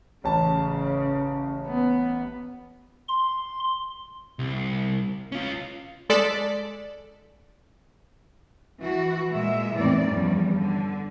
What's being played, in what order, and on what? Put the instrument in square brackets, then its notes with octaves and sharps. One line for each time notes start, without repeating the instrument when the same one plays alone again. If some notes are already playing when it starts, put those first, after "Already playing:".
[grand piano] A1 A5 [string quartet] C#3
[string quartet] B3
[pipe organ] C6
[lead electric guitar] C2
C#4 F4
[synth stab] G#3 A4 D5 B6
[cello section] E3 F#4
A#2 G#3 E5
E2 A2 D#3 E3 C4 D5
E2 G2 F3 G3 C#4
D3